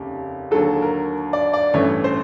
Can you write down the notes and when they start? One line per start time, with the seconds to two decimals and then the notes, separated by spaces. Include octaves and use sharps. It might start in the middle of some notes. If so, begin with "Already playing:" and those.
Already playing: F1 D#2 C#3 G4
0.51 D#2 D3 F#3 A4
0.82 A#4
1.33 D5
1.53 D5
1.74 A1 G2 E3 A3 C#4 C#5
2.04 C5